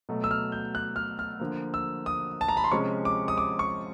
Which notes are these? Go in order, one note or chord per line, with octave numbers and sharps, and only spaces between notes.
B2 F#3 A3
E6
F6
G6
F#6
F6
F6
D3 F3 A#3
E6
D#6
A5
A#5
B5
C6
C3 F3 G#3 C#4 C#6
D6
D#6
D6
C#6